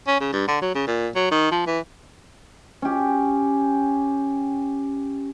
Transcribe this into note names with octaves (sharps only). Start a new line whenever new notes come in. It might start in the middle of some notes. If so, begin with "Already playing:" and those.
C#4
C#3
G2
D3
F#3
C#3
A#2
F#3
D#3
F3
E3
C#4 G4